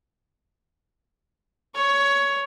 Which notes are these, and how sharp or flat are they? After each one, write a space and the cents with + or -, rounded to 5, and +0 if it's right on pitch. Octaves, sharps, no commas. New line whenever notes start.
C#5 +15 C#6 +0